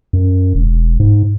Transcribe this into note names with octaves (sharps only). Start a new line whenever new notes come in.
F#2
E1
G#2